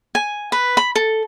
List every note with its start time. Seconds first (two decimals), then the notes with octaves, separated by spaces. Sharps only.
0.15 G#5
0.52 B4
0.77 B5
0.95 A4